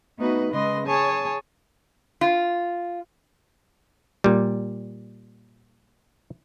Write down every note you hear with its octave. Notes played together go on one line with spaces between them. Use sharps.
A3 B3 D#4 F#4 B4
C#3 G#3 B4 D#5 C6 A#6
G#4 C#5 G#5 A5
F4
A#2 G3